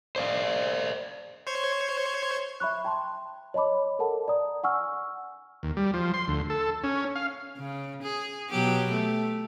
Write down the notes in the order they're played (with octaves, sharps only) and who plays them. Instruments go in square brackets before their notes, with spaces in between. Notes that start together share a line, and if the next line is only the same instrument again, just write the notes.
[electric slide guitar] C5 D5 F5
[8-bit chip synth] C5 C#5 G#6
[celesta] E5 B5 C#6 F#6
G5 A5 C6
C#5 D#5 A5 B5 D6
A4 A#4 F#5 A5
D5 A#5 D#6
F#5 G#5 C#6 E6 F6
[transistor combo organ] D#2
G3
F3
C6
D2
A4
C#4
F5
[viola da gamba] C#3
G#4
B2 F#3 G4
A3